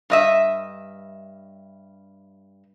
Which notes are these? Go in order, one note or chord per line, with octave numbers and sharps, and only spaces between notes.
G2 D#5 E5